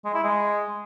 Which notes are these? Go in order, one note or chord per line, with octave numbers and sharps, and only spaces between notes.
G#3
E4
G#3